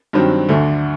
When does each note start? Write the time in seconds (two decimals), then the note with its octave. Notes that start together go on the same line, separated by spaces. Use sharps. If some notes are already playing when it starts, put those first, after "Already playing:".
0.13 G2 D#3 F#3 C4
0.48 D2 D3 A3